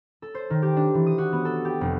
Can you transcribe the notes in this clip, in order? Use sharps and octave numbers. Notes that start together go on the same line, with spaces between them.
A4
C5
D#3
G4
D4
E3
D#6
F#4
B3
A4
G4
F1